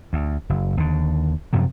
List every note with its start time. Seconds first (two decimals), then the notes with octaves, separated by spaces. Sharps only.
0.13 D2
0.50 F#1
0.77 D#2 D3
1.53 F#2 C3 F3 F#3